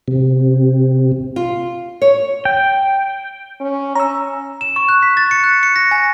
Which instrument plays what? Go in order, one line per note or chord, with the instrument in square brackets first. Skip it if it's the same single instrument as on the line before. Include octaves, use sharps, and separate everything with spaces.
[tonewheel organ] C3
[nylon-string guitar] F4
C#5
[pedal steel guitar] G5
[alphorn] C#4
[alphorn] C#4 [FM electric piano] A#5 E6
[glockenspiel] E7
C#6
F#6
B6
A6
C#7
F#6
C#7
A#6
G#5